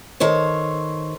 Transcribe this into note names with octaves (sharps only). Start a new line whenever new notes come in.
D#3 A4 C5 C#5